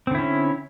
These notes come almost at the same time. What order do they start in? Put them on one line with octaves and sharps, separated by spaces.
C4 D3 E4 C#4